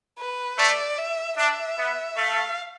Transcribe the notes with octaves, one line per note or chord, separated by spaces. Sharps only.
B4
A3 D5
E5
D4 E5
B3
A3 F5